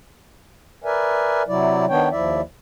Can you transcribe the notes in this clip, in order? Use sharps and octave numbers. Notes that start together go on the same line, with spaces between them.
A#4 B4 D5 E5 G#5
C3 F#3 E4 D5
D#3 B3 D4 C#5 G5
D#2 F3 E4 D5 E5